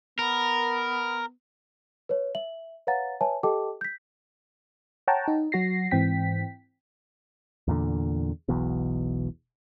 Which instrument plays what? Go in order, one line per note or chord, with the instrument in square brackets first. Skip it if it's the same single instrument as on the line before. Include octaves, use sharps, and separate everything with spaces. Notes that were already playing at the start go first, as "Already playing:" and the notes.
[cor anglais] B3 [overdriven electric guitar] A#4
[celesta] B4 C#5
E5 F#7
B4 C#5 F5 F#5 A#5 A6
B4 C#5 E5 G#5 A5
G4 A4 D#5 G5 A5 D6
G6 B6
[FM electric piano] C#5 F#5 G5 A5 A#5
D#4
F#3 F#4 A#6 C7
G#2 E3 C4 G5 B6
[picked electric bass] E2 A#2 D3
E1 B1 E2 B2